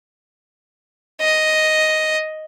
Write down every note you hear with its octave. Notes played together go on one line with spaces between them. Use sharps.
D#5